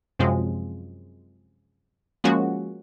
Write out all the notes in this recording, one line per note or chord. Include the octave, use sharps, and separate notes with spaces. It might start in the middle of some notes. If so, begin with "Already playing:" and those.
F#2 C3 F3 G#3
F3 G#3 A#3 C#4 F#4